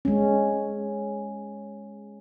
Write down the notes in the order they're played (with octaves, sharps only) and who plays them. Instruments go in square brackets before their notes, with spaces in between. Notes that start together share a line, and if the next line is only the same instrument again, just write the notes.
[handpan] G#3 C#4